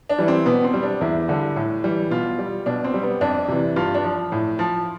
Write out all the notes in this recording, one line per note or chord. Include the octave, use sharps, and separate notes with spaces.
D4
E3 G3
C4
B2 B3
C4
G3
D4
E2 E4
D3 G3
A2
E3 G3
B2 F4
G3
B2 D4
C4
G3
B3
F2 D4
C3 E3
G2 F4
D4
F3
A2
F3